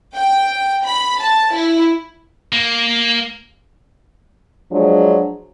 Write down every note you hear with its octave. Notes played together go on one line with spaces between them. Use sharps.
G5
B5
A5
E4
A#3
F3 F#3 G#3 D4